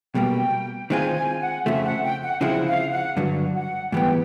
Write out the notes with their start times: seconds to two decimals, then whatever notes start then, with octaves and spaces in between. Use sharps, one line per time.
0.15 B2 G3 A#3 G5
0.90 D#3 G#3 C4 F4 G#5
1.16 G#5
1.41 F#5
1.66 F2 C#3 F3 A3 E5
1.84 F#5
2.03 G5
2.23 F#5
2.41 C#3 F3 G#3 C4 E4 F#5
2.67 F5
2.92 F#5
3.17 G2 D3 F#3
3.54 F#5
3.92 G#2 E3 G3 B3 G5